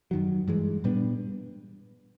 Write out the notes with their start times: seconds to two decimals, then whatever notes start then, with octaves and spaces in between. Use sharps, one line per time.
0.11 F#2 D#3 F#3
0.48 G2 E3 G#3
0.84 A#2 G3 B3 D4